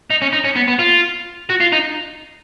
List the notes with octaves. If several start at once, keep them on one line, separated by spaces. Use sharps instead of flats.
D#4
C#4
D#4
C#4
B3
B3
F4
F#4
F4
D#4